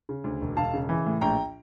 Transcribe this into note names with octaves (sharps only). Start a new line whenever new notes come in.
C#3
D2
E1
E1 F5 A5
C#3
E3
A2
A#1 G5 A#5